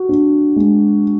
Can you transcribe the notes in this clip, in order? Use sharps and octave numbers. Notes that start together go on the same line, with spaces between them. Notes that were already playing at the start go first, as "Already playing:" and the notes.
Already playing: F#4
D4
G#3